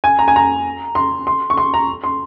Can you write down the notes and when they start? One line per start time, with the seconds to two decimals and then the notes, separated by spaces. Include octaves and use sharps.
0.04 G#5
0.19 A#5
0.28 G#5
0.36 A#5
0.95 C6
1.27 C6
1.50 C#6
1.57 C6
1.74 A#5
2.04 C6